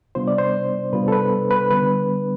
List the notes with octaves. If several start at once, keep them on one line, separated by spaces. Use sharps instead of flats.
C3 G3 B3 D4 F4 C5
D5
C5
C3 G3 B3 D4 F4 B4
A4
B4
B4
D3 G3 B3 D4 B4